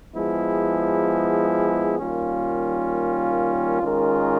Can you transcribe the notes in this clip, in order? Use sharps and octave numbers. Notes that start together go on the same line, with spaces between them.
F3 G#3 B3 E4 G#4
D#3 G3 A#3 C#4 F4
D#3 G#3 C#4 F4 A#4